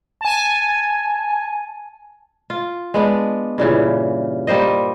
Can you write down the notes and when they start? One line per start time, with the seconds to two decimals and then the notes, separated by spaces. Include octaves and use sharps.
0.21 G#5 A5
2.50 F4
2.94 G#3 B3 D4
3.58 G2 A#2 C#3 E3
4.47 G3 A#3 C5 D#5